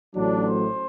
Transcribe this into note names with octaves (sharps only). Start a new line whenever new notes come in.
A1 A2 F#3 D4
C5